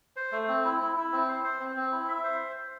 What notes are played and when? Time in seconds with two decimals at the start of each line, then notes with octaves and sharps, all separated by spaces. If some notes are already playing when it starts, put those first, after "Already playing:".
0.16 C5
0.32 A3
0.48 C4
0.65 E4
0.80 E4
0.96 E4
1.12 C4
1.28 C5
1.44 C5
1.60 C4
1.76 C4
1.92 E4
2.08 E5
2.24 C5